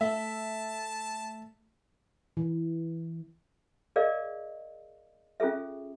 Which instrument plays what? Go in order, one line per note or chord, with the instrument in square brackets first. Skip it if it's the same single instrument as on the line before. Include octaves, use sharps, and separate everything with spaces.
[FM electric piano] A3 [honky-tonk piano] E5 [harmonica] A5
[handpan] E3
[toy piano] G#4 A#4 D5 D#5 F5
C#4 F4 G#4 A4 E5